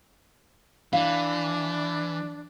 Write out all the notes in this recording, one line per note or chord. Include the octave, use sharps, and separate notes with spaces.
E3 D4 F5